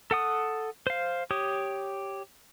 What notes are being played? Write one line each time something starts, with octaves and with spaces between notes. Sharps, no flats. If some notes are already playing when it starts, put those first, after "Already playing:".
A4 F#5 D#6
C5 F5
G4 C#5 D#6